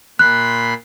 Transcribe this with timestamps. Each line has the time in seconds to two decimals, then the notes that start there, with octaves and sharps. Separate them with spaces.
0.19 A#2 B5 C6 F#6